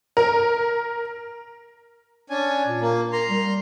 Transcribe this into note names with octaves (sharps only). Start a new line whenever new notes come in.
A#4
C#4 D4 G#5
A#2
A#3
A#4 A#5 C6
G3